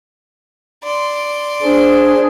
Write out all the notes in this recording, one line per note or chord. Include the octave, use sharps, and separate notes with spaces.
D5 C6
D4 G#4 C5